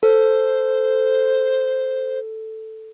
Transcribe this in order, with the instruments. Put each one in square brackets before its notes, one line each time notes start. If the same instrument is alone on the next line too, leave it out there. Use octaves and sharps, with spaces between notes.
[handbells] A4 [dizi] C5